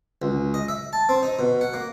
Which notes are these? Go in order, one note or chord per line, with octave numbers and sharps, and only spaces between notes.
C#2
D#5
E5
A5
C4
D#4
B2
F#5
A#3